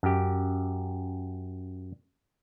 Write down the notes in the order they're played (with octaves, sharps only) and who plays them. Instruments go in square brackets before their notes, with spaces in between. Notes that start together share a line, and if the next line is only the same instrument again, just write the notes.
[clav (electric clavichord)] F#2 G4